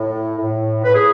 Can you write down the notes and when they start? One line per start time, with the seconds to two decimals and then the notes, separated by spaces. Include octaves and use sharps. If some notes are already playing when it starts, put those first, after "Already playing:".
Already playing: A2
0.38 A2
0.83 A2 B4
0.94 G#4